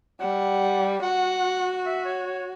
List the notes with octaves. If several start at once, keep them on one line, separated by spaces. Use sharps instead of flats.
G3 F#5
F#4 F#5
E5
C#5
C#5